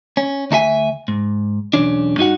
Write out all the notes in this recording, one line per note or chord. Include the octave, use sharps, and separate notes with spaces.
C#4
D2 D#4 A4 E5 G#5
G#2
B1 E2 C#4 D4
G2 D#4 F#4 F#5